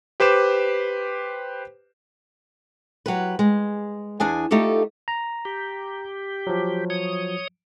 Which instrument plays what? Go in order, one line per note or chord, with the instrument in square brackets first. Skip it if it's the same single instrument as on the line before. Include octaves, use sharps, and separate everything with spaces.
[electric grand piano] G4 B4 C5 D6 E7
[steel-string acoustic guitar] F#3 G4 B4
G#3
E2 D4 G#4 G#5
A3 D#4 F4 G4 A4
[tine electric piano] A#5
[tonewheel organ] G4
[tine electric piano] F3 F#3
[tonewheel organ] C#5 D#6